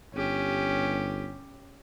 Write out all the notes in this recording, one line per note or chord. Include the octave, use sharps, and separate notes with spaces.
G1 C#4 G4